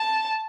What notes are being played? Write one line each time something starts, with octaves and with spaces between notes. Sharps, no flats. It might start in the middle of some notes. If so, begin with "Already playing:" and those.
Already playing: A5